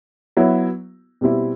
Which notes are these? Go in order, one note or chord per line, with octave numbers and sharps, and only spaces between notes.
F#3 B3 E4
B2 G3 C4 E4